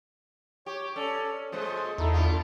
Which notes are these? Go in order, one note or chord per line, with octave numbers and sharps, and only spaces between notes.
G4 C#5
C#4 A4 D5
A#2 G#3 A3 C5 D#6
E2 D#4 E4 A4
D3 D4 E4 F4